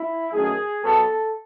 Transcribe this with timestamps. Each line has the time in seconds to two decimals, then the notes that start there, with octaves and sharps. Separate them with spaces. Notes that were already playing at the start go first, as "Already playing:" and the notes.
Already playing: E4
0.32 F#2 D#3 A3 G#4
0.83 B2 F#3 B3 A4